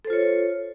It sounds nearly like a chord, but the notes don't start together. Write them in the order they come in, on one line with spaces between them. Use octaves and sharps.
A4 C5 F4 C#5